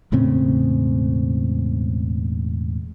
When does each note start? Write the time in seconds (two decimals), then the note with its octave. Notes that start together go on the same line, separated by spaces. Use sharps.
0.12 E1 A2 C#3 C4